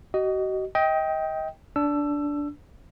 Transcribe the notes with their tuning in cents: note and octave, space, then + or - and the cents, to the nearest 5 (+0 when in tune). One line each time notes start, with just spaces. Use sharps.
F#4 +40 D#5 +0
D#5 +30 G5 +0
D4 -10 E6 +20